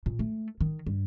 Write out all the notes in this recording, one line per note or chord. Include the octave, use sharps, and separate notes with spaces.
A#2
A3
D#3
G2